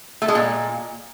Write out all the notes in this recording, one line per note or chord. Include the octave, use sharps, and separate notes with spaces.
A3
G#3
A#2